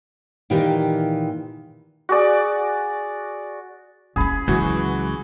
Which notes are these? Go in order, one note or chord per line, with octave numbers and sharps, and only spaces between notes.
A#2 D#3 E3 F4 G4
F#4 G#4 D5
C#4 E4 G#4 B5
C#2 E3 F#3 F#4